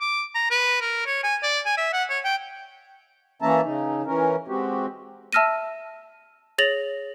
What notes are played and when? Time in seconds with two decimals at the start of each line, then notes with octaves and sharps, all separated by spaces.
0.01 D6
0.35 A#5
0.51 B4
0.81 A#4
1.06 C#5
1.24 G#5
1.43 D5
1.66 G#5
1.77 E5
1.93 F#5
2.10 C#5
2.24 G5
3.42 E3 A#3 C#4 E5 A5 A#5
3.64 C#3 D#4
4.06 E3 C#4 A#4
4.48 G#3 C4 F#4 G4
5.33 E5 A5 E6 F6 A#6 D#7
6.58 G#4 C#5 A6 A#6 F7 F#7